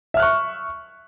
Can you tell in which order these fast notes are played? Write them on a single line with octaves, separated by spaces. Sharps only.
E5 F6 F#6 C#6